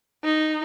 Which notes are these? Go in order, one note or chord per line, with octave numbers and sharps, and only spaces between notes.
D#4